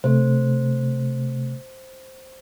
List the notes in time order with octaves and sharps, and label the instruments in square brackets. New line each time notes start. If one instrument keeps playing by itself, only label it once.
[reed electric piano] C3 A3 [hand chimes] C5